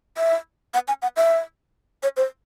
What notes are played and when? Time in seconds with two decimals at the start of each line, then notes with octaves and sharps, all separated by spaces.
0.17 E5
0.74 F#5
0.88 G#5
1.02 F#5
1.17 E5
2.03 C#5
2.17 C5